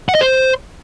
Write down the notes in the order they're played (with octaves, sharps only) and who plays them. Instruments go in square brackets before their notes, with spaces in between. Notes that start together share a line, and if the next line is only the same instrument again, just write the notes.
[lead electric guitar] F#5
D#5
C5